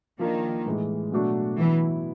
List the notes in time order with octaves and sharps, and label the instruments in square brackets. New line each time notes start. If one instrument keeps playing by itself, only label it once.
[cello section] D#3 [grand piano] F3 A#3 D4
[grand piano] A2 E3 G#3
B2 F#3 A3 D4 F#4
[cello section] E3 [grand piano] F#3 B3 E4